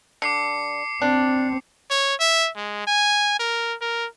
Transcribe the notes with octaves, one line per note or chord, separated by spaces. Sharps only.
D3 D6 C7 C#7
C4 D4
C#5
E5
G#3
G#5
A#4
A#4